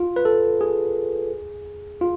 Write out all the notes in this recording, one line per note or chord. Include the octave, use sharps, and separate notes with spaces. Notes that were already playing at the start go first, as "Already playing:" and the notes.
Already playing: F4
B4
A4
G#4
F4